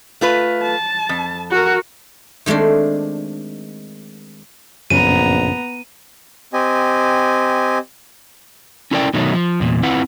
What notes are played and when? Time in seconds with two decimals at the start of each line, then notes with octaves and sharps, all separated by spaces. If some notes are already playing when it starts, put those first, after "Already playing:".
0.21 A3 F4 B4
0.63 A5
1.09 F2
1.51 F#4 A#4
2.46 D#3 G#3 A3 C4 D4
4.90 A#1 F#2 C#3 B3 C#4 A#5 D#7
6.53 C4 G4 D#5 G#5
8.91 C#4 E4 A4 A#4 D5 G5
9.14 B2 D#3 F#3 A3 D#4
9.34 F3
9.60 E2 A#2
9.83 C4 E4 F4 B4 F#5